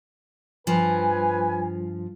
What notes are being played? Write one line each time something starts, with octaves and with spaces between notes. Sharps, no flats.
G2 F3 B4 G#5